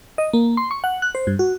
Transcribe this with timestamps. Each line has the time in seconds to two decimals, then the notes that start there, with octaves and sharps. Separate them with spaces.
0.18 D#5
0.33 A#3
0.57 C6
0.71 C#6
0.84 F#5
1.02 F#6
1.15 C5
1.27 G2
1.39 F#4